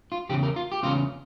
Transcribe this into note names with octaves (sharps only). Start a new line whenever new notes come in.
F4
E2 C#3 G4
A#4
F4
G4
E2 C#3 C#4 F4